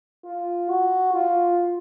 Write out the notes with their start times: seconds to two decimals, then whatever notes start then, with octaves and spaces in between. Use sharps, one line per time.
0.25 F4
0.70 F#4
1.14 F4